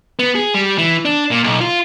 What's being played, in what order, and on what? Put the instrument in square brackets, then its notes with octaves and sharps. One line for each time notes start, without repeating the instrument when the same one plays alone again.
[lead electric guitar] B3
G#4
G3
E3
D4
A#2
B1
F4